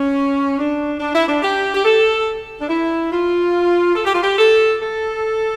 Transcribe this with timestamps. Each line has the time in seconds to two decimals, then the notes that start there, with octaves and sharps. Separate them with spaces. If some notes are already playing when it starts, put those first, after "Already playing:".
Already playing: C#4
0.58 D4
1.00 D4
1.14 E4
1.27 D4
1.43 G4
1.73 G4
1.84 A4
2.60 D4
2.69 E4
3.11 F4
3.96 A4
4.05 G4
4.14 F4
4.22 G4
4.38 A4
4.80 A4